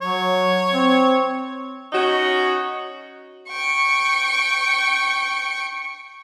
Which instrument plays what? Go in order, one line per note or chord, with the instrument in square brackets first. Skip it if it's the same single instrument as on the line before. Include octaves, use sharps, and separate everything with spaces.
[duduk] F#3 [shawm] C#5
[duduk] C4
[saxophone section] C#4 D#4 F#4
[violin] G5 C#6